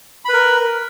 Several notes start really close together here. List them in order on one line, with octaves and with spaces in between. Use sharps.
B5 B4 A#4